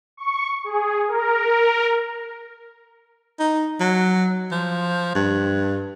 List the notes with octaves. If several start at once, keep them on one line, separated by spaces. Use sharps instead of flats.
C#6
G#4
A#4
D#4
F#3
F3
G2